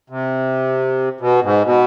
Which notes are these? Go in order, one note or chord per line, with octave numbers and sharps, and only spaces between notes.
C3
B2
G#2
B2